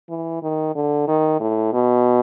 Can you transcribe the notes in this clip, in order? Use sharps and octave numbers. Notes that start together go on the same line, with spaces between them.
E3
D#3
D3
D#3
A2
B2